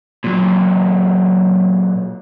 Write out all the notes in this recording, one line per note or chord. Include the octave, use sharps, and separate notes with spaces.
A#2 F#3